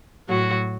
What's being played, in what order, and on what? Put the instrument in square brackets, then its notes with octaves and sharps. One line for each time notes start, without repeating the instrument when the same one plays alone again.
[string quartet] A2 F#3 F#4